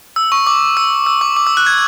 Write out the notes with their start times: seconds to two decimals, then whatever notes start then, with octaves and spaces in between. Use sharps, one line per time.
0.16 E6
0.32 C#6
0.47 D6
0.77 E6
1.06 E6
1.21 D6
1.37 D6
1.47 E6
1.57 F#6
1.66 G#6